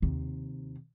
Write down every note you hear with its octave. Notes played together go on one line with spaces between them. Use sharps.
D#2 C3